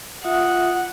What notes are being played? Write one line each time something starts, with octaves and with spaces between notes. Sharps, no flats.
F4 E5 F#5 D#6